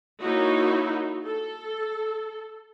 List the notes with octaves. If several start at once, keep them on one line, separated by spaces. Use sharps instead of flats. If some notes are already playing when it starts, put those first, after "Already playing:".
A#3 D#4 E4 F#4 C#5
A4